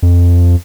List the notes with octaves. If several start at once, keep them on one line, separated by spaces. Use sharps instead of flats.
F2